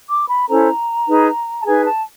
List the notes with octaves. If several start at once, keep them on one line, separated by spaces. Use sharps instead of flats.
D6
B5
C#4 E4 A4 C5 A#5
D#4 G#4 B4
A5
D#4 G#4 B4 G#5
A5